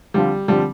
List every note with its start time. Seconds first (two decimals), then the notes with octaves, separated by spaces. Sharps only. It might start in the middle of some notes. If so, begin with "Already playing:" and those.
0.14 D3 F3 G3 C4 F4
0.48 D3 F3 G3 C4 F4